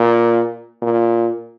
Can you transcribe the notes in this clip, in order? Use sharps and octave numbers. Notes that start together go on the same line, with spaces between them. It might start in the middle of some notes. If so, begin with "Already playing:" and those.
Already playing: A#2
A#2